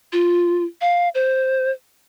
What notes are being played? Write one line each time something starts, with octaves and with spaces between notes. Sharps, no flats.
F4
F5
C5